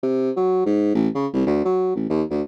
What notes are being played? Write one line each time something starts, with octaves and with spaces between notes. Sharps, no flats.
C3
F#3
G#2
A1
C#3
C2
D2
F#3
A1
D#2
D2